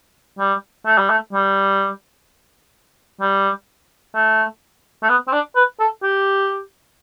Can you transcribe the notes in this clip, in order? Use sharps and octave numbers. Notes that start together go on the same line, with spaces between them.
G3
A3
G3
A3
G3
G3
A3
A3
B3
C4
D4
B4
A4
G4